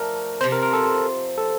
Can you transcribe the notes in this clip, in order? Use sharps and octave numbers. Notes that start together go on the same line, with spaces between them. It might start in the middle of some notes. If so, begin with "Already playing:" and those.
Already playing: F3 A3 D4 A#4
C3 F3 C4 C5
A#4
A#4
A4
A4